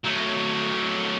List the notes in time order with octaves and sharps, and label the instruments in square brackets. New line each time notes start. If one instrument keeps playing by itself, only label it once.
[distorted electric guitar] F#3 A3